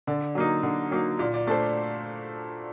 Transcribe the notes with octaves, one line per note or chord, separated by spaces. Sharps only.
D3 D5
F#3 A#3 D#4
D3
F#3 A#3 D#4
A#2 D5
D5
A3 D4 A4 C5 D5